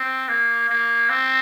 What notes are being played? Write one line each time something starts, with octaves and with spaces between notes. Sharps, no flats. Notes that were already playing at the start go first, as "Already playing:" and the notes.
Already playing: C4
A#3
A#3
C4